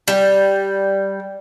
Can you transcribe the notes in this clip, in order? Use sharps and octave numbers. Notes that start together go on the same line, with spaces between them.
G3